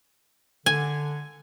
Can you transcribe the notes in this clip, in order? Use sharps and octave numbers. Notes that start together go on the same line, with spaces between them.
D3 G#5